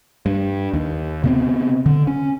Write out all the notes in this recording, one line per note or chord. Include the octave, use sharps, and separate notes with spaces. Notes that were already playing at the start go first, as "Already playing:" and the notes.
G2
D#2
C3 B3 C4
D3
C#4